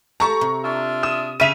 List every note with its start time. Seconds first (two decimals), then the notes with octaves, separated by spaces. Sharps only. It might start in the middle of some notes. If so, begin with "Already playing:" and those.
0.20 G4 A4 A5 A#5 C#6
0.41 C3
0.64 D4 F4 E5
1.03 D#6 E7
1.40 C#3 E5 D#7 F7